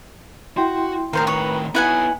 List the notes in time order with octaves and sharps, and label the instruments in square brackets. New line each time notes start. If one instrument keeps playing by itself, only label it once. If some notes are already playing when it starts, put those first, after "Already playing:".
[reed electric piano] E4 G5 C6 [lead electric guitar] F#4
[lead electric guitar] A2 D#3 [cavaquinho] A#4 C5 F5 [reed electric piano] A#5
[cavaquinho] B4 C#5
[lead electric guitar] B3 D#4 [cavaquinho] E4 F#5 G#5